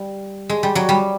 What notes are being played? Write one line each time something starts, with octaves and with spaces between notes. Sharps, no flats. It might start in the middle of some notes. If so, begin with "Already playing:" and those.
Already playing: G3
G#3
G3
F#3
G3